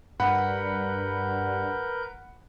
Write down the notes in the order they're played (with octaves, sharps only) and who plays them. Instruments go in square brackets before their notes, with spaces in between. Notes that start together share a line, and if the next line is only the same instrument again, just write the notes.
[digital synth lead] G2 [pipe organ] A#4 B4 G6 [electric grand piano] F#5 B5